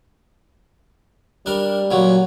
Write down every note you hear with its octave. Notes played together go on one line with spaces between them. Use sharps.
G3 D4 A#4
A#2 F#3